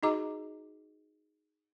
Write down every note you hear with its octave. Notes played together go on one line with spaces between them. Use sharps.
D#4 F#4 G#4 D#5 A#5 D6